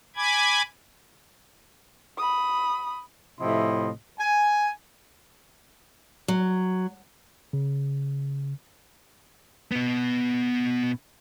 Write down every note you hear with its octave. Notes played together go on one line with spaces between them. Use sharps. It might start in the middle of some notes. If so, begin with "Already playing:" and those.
G#5 B5 D6 G#6
B5 D#6
A2 C3 F3 E4 D#5 C6
G#5
F#3
C#3
B2 B3